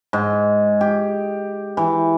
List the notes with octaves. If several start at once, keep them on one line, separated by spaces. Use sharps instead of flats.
G#2
G4
E3